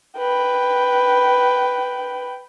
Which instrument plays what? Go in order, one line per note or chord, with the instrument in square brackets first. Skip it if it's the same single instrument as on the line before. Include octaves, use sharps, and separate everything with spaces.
[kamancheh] B4 G5